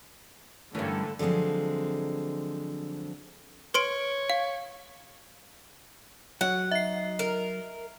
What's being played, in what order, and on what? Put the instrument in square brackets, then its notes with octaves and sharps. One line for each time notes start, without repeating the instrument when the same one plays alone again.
[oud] G2 C#4 [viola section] D3 A4 [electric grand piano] E3 A3 A#4
[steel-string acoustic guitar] D3 F3 F#3 G#3 C4
[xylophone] B4 C6 D7 [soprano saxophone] C#5
[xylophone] F5
[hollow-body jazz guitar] F#3 [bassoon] F#4 [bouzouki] F#5
[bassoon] D#4 [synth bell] E5 C7
[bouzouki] A#4